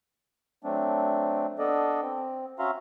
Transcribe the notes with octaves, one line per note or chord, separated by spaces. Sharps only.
F#3 A3 C4 D4
B3 D4 A4 D5 D#5
C4
C#4 F#4 E5 F5 A#5 C6